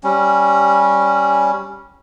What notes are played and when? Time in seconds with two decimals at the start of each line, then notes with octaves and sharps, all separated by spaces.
0.03 G3 C#4